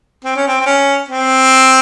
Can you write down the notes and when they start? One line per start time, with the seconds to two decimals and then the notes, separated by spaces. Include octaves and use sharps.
0.25 C4
0.36 C#4
0.47 C4
0.60 C4
0.66 C#4
1.09 C4